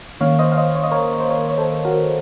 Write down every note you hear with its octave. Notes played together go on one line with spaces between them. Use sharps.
D#3 A#3 C#4 C#5 F5
C5 D#5
F5
C5 D#5
C#5
D#5
A#4 C#5
C5
A#4 C#5
C#5
A4 C5
F#4 A#4